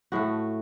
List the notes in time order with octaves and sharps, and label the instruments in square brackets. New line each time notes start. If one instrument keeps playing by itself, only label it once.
[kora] A2 A3 F#4